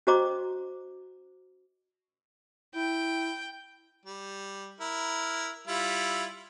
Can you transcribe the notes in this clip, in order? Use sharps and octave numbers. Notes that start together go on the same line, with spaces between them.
C#4 F#4 C5 D#5 A#5 D6
E4 G5
G3
E4 A#4
G3 E4 F4